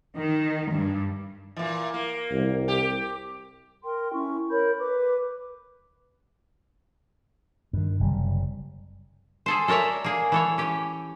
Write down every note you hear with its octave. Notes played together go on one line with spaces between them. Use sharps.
D#3
G2
A#2 E3
A#3
C2
G4
A#4 G5 C6
C#4 E4 C#6
A#4 C#5 B5 G6
B4 D6
G2 D#3
F#1 C3 G3
G#4 A4 C5
A4 A#4 C#5 D5 E5
A#3 G#4
E3 A4 C#5
C#4 G4